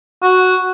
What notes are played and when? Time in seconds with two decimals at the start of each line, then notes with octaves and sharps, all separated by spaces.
0.22 F#4